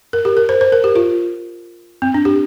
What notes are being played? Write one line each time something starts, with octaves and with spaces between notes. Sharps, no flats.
A#4
G4
A#4
C5
C5
A#4
G4
F4
C4
D4
G4